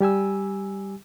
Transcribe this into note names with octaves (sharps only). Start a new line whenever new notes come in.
G3 G4 G#5 E6